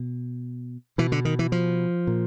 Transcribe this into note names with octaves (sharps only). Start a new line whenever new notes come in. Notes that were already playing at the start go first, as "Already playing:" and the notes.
Already playing: B2
B2 E3
D3
D#3
E3
F3
A#2